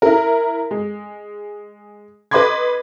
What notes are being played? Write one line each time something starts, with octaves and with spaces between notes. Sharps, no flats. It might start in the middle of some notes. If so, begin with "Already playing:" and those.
E4 A#4
G#3
B4 D#5 B5 C6 D6 G#6